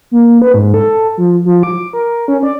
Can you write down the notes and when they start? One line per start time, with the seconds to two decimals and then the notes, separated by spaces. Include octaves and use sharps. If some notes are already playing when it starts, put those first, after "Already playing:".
0.11 A#3
0.42 B4
0.54 G#2
0.74 A4
1.18 F3
1.45 F3
1.63 D6
1.93 A#4
2.28 C#4
2.43 D5